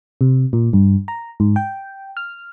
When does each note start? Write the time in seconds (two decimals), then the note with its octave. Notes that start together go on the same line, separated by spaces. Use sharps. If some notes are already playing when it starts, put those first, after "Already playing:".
0.21 C3
0.53 A#2
0.73 G2
1.08 A#5
1.40 G#2
1.56 G5
2.17 F6